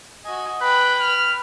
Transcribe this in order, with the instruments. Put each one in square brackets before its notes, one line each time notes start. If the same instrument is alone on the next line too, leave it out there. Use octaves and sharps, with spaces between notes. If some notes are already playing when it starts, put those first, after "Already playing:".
[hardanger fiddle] F#4 G#5 [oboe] D#5
[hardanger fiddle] B4 G5 [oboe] B5 [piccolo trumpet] F#6
[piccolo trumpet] F6